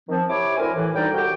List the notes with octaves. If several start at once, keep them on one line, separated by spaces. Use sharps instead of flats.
D#3 F3 C4
C3 E4 G4 C#5 D6
D2 C4 E4 A#4 G#5
A2 E3
D2 D3 G3 D#4 D5 G5
C2 F#4 G4 G5